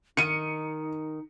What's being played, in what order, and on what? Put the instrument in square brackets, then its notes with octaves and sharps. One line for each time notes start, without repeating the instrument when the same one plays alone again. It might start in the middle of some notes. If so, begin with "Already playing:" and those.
[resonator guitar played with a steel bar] D#3 [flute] D#4 [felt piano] C#7 D#7